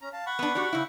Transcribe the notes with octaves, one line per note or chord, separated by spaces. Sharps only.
C#4 A#5
F5 A5
F#5 B5 C#6
B3 D4
F#4 G4 D5
C#3 E4